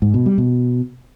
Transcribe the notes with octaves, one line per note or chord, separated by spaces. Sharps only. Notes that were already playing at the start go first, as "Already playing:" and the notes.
G#2
B2
G3
B2